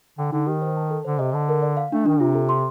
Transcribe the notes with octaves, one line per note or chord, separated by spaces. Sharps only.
D3 G5
D3 D#4
D#3 G4
C5
A5
A4
D3 C5
C3 D#5
D3 A5
A#4
D5
F5
A3 D4
D#3 D4
C3 F4
A4
C6